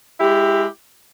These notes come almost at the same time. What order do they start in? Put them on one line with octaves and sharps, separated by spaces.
E4 G4 G#3